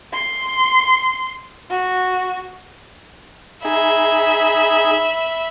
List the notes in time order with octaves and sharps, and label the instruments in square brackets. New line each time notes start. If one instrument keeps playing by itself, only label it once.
[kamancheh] C6
F#4
[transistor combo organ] D#4 G#4 [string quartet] E5 B5